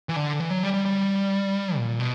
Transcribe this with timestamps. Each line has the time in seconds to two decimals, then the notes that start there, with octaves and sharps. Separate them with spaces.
0.09 E3
0.16 D3
0.40 E3
0.50 F#3
0.63 G3
0.74 G3
0.86 G3
1.77 A#2
2.00 B2